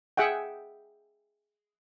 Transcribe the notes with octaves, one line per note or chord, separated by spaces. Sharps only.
G#4 E5 F#5 G5